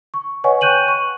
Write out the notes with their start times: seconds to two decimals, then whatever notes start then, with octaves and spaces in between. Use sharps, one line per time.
0.14 C#6
0.44 B4 C#5 D#5 F#5 G#5 C#6
0.61 G5 C#6 F#6 G6 D#7 F#7
0.88 C#6